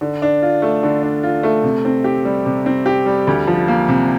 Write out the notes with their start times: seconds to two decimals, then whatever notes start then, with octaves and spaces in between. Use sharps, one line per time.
0.01 D3
0.22 D4
0.42 F4
0.62 A3
0.83 D3
1.03 D4
1.23 F4
1.43 A3
1.64 C3
1.85 C4
2.04 G4
2.25 G3
2.46 C3
2.66 C4
2.86 G4
3.06 G3
3.27 D2
3.47 F3
3.68 A#3
3.88 C3